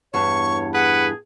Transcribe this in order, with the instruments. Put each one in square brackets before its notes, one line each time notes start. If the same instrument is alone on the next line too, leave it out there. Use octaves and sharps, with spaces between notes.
[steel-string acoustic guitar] E2 G2 [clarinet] C#5 [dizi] C#6
[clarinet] G#4 [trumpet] B4 [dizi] F#5